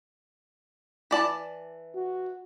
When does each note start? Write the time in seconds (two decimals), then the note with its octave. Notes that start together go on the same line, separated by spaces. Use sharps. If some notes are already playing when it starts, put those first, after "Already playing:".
1.11 E3 D5 A5
1.95 F#4